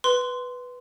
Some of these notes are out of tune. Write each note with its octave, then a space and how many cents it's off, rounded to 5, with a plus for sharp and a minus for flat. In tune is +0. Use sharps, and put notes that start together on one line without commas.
B4 +0 C6 -15